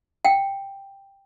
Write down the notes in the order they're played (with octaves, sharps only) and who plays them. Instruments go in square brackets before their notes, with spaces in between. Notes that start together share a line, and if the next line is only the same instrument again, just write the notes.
[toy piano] F#5 G5